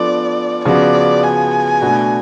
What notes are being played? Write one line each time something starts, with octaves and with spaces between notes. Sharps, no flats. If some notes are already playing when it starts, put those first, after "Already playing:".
Already playing: F3 B3 D4 F4 A4 D5
C#3 F3 B3 F#4 D5
G#5
B2 A3 D4 F#4